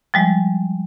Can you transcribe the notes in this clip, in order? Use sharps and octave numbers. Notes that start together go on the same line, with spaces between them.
F3 G3 G#3